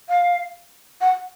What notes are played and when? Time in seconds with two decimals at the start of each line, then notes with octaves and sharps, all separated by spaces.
0.09 F5
1.01 F#5